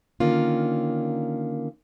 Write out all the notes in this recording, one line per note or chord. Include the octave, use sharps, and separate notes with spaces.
D3 D#3 A#3 C#4 F4